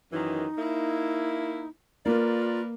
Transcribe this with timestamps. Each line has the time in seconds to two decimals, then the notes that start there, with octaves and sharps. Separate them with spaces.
0.12 F#2 D#3 E3 D#4
0.58 A#3 E4
2.06 A#3 F4 A#4 B4 D5